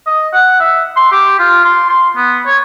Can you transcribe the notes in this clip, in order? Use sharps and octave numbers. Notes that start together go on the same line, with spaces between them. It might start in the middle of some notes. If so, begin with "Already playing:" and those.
D#5
F#5
E5
C6
G4
F4
C6
C6
B3
C#5